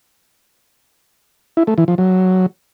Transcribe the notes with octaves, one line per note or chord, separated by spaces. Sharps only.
E4
A3
E3
F3
F#3